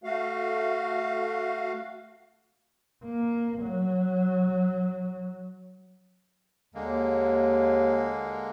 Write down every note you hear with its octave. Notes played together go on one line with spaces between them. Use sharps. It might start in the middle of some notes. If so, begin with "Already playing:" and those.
A3 F#4 F5
A#3
F#3
D#2 D3 G#3 A#3